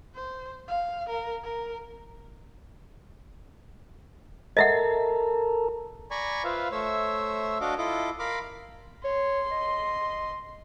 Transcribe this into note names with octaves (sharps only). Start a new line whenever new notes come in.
C5
F5
A#4
A#4
A4 A#4 D#5 E5 F#5
D5 G#5 A#5 B5 C#6
F4 B4 C5 E5 F5
A3 C5 C#5 E5 E6
D4 F#4 D#5 F5 D6
E4 F4 A4 D#5 D6
A#4 F5 B5 C6 D6
C#5 C6
D#5